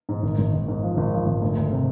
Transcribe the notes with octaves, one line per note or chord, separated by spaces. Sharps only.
G#2
G#1
G#1
G#1
G#2
F3
G#1
F3
G#1
D2
D2
C3